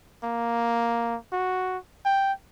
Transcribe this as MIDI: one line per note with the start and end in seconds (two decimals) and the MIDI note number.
0.24 1.16 58
1.33 1.78 66
2.05 2.33 79